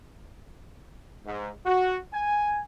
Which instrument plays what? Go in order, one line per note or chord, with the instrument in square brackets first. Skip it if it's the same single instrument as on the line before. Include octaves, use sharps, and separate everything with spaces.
[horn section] G#2
F#4
G#5